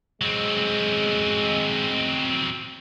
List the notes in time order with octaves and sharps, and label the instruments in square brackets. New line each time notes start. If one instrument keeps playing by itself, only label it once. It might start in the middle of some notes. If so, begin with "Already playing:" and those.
[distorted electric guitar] F#3 C4 [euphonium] G#3